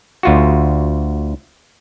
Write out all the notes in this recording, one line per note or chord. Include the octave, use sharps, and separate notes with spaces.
D2 F4 F#4